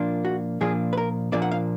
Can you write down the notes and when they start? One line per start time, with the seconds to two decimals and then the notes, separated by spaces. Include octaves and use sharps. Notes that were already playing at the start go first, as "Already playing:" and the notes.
Already playing: A#2 F3 A#3 D4 F4
0.25 F#4
0.61 A#2 F3 A#3 D4 F4 G#4
0.93 B4
0.97 A#4
1.32 A#2 F3 A#3 D4 F4 D5
1.42 F#5
1.51 F5